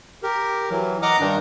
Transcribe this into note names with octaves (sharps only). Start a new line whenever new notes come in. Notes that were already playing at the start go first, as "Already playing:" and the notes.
G4 A#4
E3 F#3
D#5 F#5 A#5 D6 D#6 F6
G2 D#3 D4 D#4